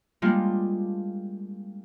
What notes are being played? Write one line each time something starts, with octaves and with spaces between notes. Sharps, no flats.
G3 G#3 A#3 D4 F4